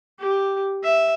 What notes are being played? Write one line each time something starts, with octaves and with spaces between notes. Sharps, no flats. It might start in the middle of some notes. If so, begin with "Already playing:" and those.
G4
E5